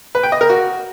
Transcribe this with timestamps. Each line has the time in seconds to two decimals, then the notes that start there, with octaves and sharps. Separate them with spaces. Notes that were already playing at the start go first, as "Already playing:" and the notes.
0.15 B4
0.23 G5
0.32 D#5
0.41 A#4
0.50 F#4